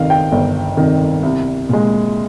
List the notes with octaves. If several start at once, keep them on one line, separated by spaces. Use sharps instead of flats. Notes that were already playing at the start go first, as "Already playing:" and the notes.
Already playing: G1 F2 D#3 F5
G5
G1
F2 D#3
C2
A#2 G#3